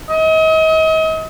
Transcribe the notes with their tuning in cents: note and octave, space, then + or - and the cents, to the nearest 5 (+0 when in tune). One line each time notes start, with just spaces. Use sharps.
D#5 +40